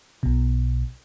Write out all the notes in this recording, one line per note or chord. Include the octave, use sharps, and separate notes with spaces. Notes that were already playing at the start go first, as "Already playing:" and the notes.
B1 B2